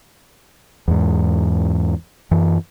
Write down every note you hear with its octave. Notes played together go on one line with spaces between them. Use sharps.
E2 G#2
F#2 E3